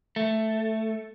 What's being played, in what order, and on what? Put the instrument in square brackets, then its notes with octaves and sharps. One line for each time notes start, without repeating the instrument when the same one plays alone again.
[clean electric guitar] A3